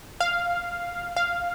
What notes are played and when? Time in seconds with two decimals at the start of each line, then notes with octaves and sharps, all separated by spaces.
0.20 F5
1.16 F5